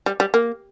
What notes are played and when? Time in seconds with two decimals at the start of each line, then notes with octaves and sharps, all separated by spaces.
0.06 G3
0.20 G3
0.34 A#3